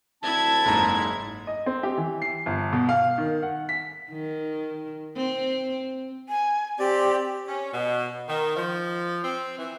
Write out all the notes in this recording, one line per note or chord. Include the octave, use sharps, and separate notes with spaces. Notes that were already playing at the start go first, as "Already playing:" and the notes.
D2 C4 E4 A5 G#6
F#1 G#2 A#5
D#5
C4
G4
E3
C7
G1
B2
F5
D#3
F#5
B6
D#3
C4
G#5
C4 G4 D5
C#4
B2
D#3
F3
C4
E3